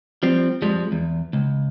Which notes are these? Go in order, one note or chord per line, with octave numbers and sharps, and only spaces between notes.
F3 G3 C4
F2 F3 G3 G#3
E2
C#2